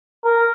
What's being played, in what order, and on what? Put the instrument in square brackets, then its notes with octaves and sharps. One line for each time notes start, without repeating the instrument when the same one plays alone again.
[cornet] A#4